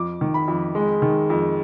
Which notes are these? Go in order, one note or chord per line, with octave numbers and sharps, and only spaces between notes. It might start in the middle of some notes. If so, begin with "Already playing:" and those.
Already playing: F2 D6
D#3
B5
F2
G#3
D#3
F2